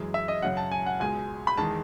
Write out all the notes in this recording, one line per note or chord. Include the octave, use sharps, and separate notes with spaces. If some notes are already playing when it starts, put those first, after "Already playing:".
Already playing: F#2 E3 G#3
E5
D#5
F#2 C#3 F#3 F#5
A5
G#5
F#5
C#2 B2 G#3 G#5
B5
E2 D#3 G#3 A5